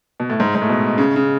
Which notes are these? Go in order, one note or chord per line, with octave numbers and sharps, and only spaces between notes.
B2
A2
G#2
G#2
A2
B2
C#3
C#3